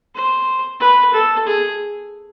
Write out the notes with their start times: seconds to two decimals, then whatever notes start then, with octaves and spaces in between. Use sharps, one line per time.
0.15 C5
0.80 B4
1.14 A4
1.47 G#4